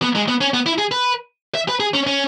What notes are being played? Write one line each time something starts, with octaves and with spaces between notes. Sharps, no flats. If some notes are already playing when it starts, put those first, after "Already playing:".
B3
G#3
B3
C#4
B3
E4
G#4
B4
E5
B4
G#4
C#4
C#4